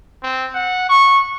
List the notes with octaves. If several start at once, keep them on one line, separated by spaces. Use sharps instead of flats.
C4
F#5
C#6